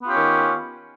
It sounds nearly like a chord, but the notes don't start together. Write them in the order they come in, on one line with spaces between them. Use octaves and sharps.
B3 F4 G4 C#4 D#3